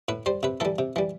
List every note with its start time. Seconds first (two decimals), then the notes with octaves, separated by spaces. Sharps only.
0.08 A2 B4
0.26 G3 C5
0.43 C3 B4
0.60 E3 G3 A4
0.79 C3
0.96 E3 G3